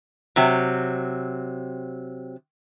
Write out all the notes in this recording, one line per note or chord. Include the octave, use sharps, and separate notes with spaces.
C3 F#3 C4